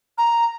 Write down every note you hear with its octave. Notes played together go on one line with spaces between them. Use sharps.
A#5